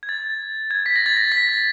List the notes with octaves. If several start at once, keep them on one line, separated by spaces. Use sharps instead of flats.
G#6
A6
G#6
B6
A#6
A6
A#6
B6